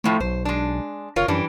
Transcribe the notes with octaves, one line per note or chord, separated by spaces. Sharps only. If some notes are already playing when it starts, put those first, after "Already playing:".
F2 A2 F3 A3
B1 C5
G#3 D4
F#1 F4 A#4 C#5
F#2 E3 G3 D4